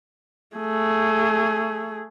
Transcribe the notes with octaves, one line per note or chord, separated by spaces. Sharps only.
A3 G#4